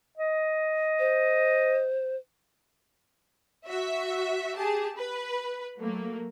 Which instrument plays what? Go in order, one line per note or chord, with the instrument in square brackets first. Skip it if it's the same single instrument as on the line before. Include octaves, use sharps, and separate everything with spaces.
[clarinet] D#5
[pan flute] C5
[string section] F#4 E5
G4 G#4 A5
B4
F#3 A3 A#3